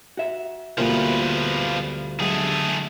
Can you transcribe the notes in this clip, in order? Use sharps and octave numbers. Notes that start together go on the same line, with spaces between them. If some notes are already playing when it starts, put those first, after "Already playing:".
F#4 E5
D2 B2 F3 G3 A#3 F4 B4
D3 F#3 G#3 A3 G#4